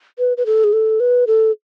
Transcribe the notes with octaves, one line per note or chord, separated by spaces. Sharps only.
B4
B4
A4
G#4
A4
B4
A4